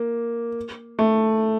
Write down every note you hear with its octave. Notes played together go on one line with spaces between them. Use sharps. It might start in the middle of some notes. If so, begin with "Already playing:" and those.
Already playing: A#3
A3